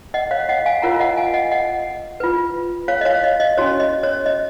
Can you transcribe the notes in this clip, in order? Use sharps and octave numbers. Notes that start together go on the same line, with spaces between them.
D#5 F#5
C#5 F5
D#5 F#5
F5 G#5
F4 A#4 C#5 F#5 A#5
D#5 F#5
F5 G#5
D#5 F#5
D#5 F#5
F4 B4
C#5 F5
D#5
C#5 F5
D#5
D#5
C#4 F#4 C#5
D#5
C#5
D#5